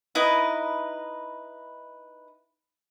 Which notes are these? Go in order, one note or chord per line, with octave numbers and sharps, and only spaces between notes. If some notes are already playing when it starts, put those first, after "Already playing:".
D#4 E4 B4 D#5